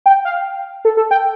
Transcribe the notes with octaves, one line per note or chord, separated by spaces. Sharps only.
G5
F5
A4
A4
G5